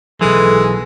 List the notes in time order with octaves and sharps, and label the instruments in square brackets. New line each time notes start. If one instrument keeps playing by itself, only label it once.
[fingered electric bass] B2 F#3 [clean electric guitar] E3 [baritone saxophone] G#3 [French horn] A4